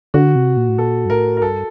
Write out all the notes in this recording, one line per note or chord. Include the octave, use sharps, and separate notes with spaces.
D3 F#4
C3
A#2
A2
A#2 A4
G2
A2 A#4
A#4
G2 A4